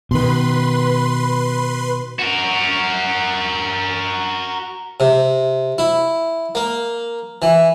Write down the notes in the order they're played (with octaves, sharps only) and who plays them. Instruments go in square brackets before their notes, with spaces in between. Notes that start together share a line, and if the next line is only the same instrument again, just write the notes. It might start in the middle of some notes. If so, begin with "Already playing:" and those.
[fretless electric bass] B2 D#3 [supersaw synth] B4 B5 C6
[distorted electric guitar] F#4 A#4
[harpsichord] C3
E4
A#3
E3